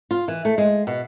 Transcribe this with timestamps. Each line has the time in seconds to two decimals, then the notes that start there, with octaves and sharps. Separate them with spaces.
0.11 F4
0.28 E3
0.45 A3
0.58 G#3
0.87 B2